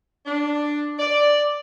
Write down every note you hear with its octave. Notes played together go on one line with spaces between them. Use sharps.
D4
D5